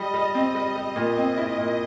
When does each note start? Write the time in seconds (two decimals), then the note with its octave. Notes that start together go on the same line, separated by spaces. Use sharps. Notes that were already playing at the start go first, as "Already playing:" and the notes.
Already playing: G3 D#5
0.14 G3
0.35 C4
0.55 G3
0.76 G3 D#5
0.96 A#2
1.17 C4
1.38 E4
1.58 A#2